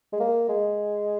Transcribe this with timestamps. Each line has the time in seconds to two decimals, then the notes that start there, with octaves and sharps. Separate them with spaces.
0.13 G#3
0.20 A#3
0.49 G#3